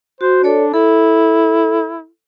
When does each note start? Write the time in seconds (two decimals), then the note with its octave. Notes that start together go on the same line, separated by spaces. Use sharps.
0.21 F#4 C5
0.43 D4 A4 C#5 D5
0.74 E4 A4